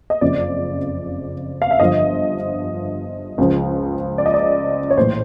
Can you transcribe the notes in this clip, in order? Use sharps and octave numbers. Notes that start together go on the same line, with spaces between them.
D#5
F#1 F2 C#3 F3 D5
F5
E5
G1 G2 D3 F3 D#5
C#2 C#3 F3
D5
D#5
D5
C#5
A#1 A2 E3 C5